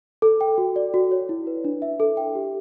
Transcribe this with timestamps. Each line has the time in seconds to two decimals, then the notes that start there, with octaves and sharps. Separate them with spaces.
0.22 A4
0.41 G5
0.58 F#4
0.76 D5
0.94 F#4
1.11 C#5
1.29 E4
1.47 B4
1.64 D4
1.82 E5
2.00 A4
2.17 G5
2.35 G4